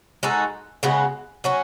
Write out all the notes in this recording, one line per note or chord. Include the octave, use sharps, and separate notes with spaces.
G#3 D#4 F#4 A4
C#3 G#3 B3 F#4
F#3 C#4 F#4